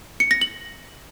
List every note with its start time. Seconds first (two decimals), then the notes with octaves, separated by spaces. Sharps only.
0.20 C#7
0.31 A#6
0.41 F#7